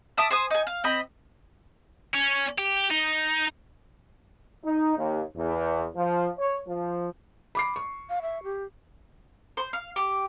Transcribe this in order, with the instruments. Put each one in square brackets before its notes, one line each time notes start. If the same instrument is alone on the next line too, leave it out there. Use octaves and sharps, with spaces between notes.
[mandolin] E5 A5 D6 D#6
C5 G#5 D#6
D#4 G#5
F5
C4 D#5 B5
[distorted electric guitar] C#4
G4
D#4
[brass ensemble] D#4
D#2
E2
F3
C#5
F3
[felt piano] B5 D6 C7
C#6
[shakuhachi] F5
E5
G4
[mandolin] C5
F5
G4